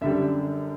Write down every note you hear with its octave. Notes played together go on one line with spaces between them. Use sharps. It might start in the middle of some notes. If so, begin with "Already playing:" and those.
F#2 D3 G3 E5